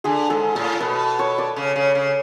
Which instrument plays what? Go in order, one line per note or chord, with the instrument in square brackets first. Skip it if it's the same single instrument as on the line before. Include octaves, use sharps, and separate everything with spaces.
[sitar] D3 [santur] G#4
[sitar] G#2 [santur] A4
[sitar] A2 [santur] A4
[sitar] B2 [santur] B4
[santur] C#5
D5
[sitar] C#3
C#3
C#3